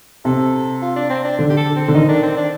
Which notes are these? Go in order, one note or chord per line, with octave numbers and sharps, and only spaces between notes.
C3 A4
F4
D4
C4
D4
D3
G4
A4
C4
D3
D#3 D#4
D4
C4
D4